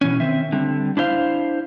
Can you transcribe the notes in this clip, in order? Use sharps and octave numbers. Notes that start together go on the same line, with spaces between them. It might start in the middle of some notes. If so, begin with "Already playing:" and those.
B2 E3 C#4
D#3 C4 E5
D3 G3 C4
D4 E4 C5 F5